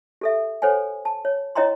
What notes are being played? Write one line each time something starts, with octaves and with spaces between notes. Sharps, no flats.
G4 A4 E5
A4 C5 C#5 F#5 G#5
A5
C#5
E4 C#5 D#5 G5 A#5 C6